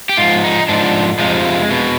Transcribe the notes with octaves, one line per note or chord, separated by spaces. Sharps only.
G4
G#2 F4
F3
D#4
G#2 F3 D4
F2 C3 F3 G#3
B2